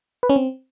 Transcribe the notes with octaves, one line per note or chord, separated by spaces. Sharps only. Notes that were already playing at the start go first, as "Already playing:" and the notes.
B4
C#4
C4